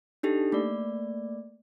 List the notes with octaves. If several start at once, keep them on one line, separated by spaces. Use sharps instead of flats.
D4 D#4 G4 A4
A3 A#3 D5